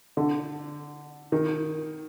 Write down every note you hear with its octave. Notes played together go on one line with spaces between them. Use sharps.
D3
D#3